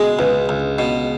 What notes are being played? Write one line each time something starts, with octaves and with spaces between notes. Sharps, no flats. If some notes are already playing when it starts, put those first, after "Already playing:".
Already playing: B2 G#3 G#4
C#2 B4
C#2
B2